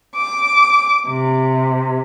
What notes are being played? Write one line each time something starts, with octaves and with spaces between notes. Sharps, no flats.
D6
C3